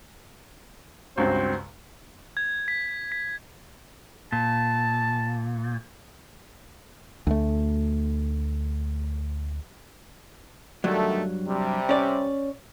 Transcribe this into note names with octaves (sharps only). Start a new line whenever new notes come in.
C#2 G2 C4 F#4 C5
G#6
B6
B6
A#2 A5
D2 A3
G2 D3 D#3 F#3 A3
C3 G3
C#4 D5